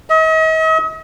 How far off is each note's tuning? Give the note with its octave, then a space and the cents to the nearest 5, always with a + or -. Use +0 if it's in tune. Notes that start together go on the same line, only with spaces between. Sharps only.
D#5 +45